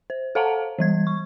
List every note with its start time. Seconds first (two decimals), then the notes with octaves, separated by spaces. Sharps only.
0.10 C5
0.35 A4 C5 F5 F#5 A5 A#5
0.79 E3 G3 G#6
1.07 C#6